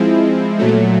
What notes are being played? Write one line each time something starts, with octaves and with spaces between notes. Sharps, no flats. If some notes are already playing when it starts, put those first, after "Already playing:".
Already playing: F3 G#3 C4 E4
A#2 F#3 A3